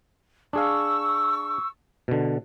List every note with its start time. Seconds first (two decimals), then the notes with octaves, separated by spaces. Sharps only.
0.53 D4 G#4 F5 C#6 E6
2.08 B2 D3